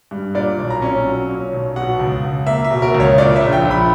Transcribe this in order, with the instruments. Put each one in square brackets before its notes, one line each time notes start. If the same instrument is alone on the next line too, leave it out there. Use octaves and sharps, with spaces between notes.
[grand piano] G2
A#2 D5
B1
A#5
C#4
F#3
A#2
B1
B2 F#5
C#2
C#2
A#3 E5
E5
B2
A#4
C#2
C#5
A#2 D5
E5
A#1
G5
A#1
B5